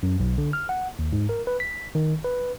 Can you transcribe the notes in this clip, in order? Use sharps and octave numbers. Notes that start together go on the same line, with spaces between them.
F#2
B1
D3
F6
F#5
D#2
G#2
A#4
B4
B6
D#3
B4